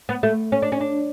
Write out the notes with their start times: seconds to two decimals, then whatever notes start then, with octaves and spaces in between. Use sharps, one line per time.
0.09 B3
0.23 A3
0.52 C#4
0.62 D4
0.72 C#4
0.81 D4